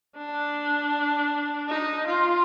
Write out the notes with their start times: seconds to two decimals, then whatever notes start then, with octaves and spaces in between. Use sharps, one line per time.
0.17 D4
1.69 D#4
2.07 F4